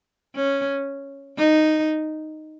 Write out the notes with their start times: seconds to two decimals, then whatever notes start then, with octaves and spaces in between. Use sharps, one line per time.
0.35 C#4
1.38 D#4